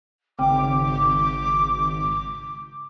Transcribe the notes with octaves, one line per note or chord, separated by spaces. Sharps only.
G#1 C#3 C4 G5 D6